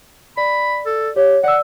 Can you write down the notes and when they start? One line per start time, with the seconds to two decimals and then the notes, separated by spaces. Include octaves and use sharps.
0.37 D5 B5
0.86 A4
1.16 G4 C#5
1.44 D5 F#5 E6